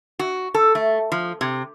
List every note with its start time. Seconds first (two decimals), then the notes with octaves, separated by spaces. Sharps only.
0.19 F#4
0.54 A4
0.75 A3
1.12 F3
1.41 C3